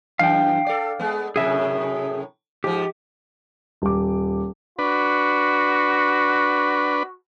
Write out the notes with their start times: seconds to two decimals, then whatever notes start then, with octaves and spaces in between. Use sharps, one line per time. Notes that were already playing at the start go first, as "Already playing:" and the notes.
0.19 F#2 E3 F5 G5
0.67 A4 D5
0.99 G#3 B3
1.36 F#2 A2 C3 G#4 E5
2.64 G#2 F3 G4
3.82 D#1 D6
4.79 D4 F#4 B4